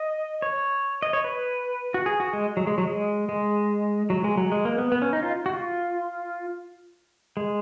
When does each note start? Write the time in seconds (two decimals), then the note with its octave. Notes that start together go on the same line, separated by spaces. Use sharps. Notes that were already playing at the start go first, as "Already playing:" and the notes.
Already playing: D#5
0.42 C#5
1.02 D#5
1.13 C#5
1.24 B4
1.94 F#4
2.06 G#4
2.20 F#4
2.33 G#3
2.57 F#3
2.67 G#3
2.78 F#3
2.87 G#3
3.29 G#3
4.10 F#3
4.24 G#3
4.37 F#3
4.52 G#3
4.65 A#3
4.78 B3
4.92 B3
5.02 C#4
5.13 D#4
5.23 F4
5.46 F#4
5.53 F4
7.37 G#3